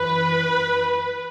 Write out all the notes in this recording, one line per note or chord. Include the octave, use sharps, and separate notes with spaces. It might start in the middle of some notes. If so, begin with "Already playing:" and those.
Already playing: F#2 E3 B4